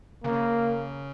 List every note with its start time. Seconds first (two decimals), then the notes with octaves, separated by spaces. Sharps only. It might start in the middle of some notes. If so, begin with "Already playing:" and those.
0.24 C#3 A#3